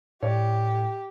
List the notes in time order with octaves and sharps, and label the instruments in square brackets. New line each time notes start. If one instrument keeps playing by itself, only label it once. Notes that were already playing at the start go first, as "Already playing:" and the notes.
[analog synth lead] A2 [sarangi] G4 [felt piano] C#5 D5